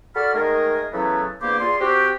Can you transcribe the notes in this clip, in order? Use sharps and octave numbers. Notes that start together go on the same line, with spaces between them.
F#4 A4 D5 A5 B5 F6
D#3 G#3 A3 G#4 A#4 D#5
C#3 E3 F#3 A3 B3 A4
E2 G2 A#3 G4 C5 D6
F4 G#4 D5 C6
C4 F#4 G4